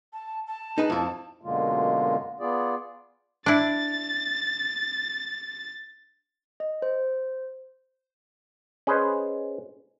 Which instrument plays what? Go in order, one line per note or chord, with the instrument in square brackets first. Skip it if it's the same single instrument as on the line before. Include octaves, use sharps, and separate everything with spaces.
[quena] A5
A5
[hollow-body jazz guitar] D#4 G#4 B4
F2 E4
[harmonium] F#2 B2 D3 G#3 A#3 F4
B3 F4 G#4 D5
[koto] D4 E4 [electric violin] A6
[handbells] D#5
C5
[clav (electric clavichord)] C#4 G#4 B4 C5 D#5